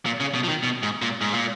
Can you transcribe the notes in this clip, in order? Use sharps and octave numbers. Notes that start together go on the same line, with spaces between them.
A#2
C#3
B2
F3
D#3
B2
G#2
A#2
G#2
A#2